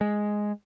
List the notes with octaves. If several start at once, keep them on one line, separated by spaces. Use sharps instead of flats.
G#3